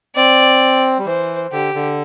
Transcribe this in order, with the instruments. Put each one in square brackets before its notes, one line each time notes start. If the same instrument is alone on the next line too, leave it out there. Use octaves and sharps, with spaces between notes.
[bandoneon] C4 [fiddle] D5
[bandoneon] G3
[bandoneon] E3 [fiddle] C5
[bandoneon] D3 [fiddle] G4
[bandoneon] D3